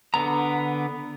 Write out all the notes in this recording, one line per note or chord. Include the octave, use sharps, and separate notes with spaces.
D3 B3 A#5